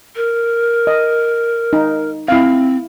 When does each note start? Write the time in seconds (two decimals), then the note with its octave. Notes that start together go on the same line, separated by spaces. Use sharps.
0.16 A#4
0.87 D#5
1.73 D#4
2.28 C4 E4 F5